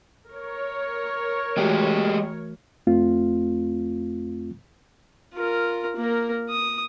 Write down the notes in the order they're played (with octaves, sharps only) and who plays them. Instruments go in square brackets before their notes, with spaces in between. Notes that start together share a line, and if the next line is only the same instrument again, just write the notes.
[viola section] A#4 C#5
[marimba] E3 A3 F#4 [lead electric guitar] G#3 G4
[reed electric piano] F2 A3 C4 F4
[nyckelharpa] F4 A#4
A#3 A#4
D#6